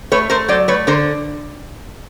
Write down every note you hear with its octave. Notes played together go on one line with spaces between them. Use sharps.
A3 B4 C#5
A3 A#4 C5
F#3 C5 D5
A3 B4 C#5
D3 A#4 C5